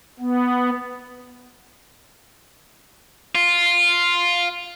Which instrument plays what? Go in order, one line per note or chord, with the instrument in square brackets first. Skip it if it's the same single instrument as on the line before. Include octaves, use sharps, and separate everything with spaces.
[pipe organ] B3
[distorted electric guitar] F4